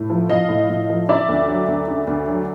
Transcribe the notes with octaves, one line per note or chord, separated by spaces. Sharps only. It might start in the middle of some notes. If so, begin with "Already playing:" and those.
Already playing: A2
F3
F3 D#5 F5
A2
A2
F3
C#3 D5 E5
D2
F#3
D2
C#3
D2
F#3